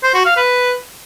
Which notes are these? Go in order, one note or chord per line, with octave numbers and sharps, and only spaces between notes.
C5
F#4
F5
B4